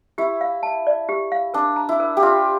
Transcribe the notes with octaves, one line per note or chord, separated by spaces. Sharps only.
E4 G4
F5
A5
D5
G4
F5
D4 A#4
A#5
E4
A#4
G4
F4 E5